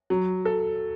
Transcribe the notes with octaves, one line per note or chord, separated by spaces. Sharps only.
F#3
A4